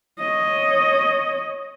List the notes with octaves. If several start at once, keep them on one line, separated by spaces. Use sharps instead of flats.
C#5 D#5